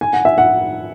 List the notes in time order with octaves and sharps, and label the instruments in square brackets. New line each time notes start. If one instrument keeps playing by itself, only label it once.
[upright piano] G#5
F#5
E5
F#5